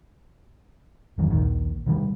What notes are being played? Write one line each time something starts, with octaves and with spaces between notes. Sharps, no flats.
F2 G#2 D#3 F#3
A#1 D#2 D#3
C3 D#3 G3